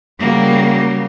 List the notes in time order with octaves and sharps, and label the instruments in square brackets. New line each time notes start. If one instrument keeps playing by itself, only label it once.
[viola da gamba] C#3 F#3 G3 [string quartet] A#3